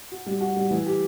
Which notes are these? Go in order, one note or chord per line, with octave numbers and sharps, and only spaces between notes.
F#4
G3
F#4
G3
E3
G4